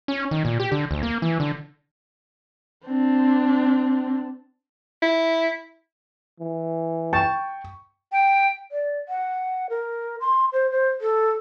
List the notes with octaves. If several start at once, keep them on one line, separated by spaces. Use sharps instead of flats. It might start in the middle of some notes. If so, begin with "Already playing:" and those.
C#4
D#3
A#2
G4
D3
D2
A#3
E3
D3
C4 D4
E4
E3
G5 A5 C#6
G5
D5
F#5
A#4
C6
C5
C5
A4